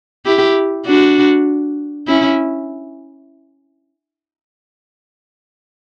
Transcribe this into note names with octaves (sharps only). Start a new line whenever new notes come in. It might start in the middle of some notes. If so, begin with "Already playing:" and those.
E4 G4
D4 F#4
C#4 E4